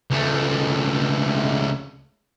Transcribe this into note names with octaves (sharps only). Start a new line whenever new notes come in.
C#2 A3